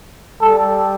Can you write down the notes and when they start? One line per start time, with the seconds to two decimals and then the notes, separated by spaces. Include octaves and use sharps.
0.41 G3 A4